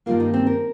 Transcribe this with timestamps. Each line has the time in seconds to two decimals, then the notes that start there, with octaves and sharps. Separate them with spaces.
0.06 G2 D#3 G3 A#3 F4
0.20 D#4
0.34 C4
0.47 A#4